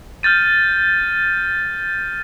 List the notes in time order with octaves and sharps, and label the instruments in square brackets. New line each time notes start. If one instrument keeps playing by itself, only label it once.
[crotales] F6 G6 A6 D#7